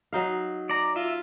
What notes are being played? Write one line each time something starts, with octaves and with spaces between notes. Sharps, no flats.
F#3 D#4 F5
D5 A#5
F4 E5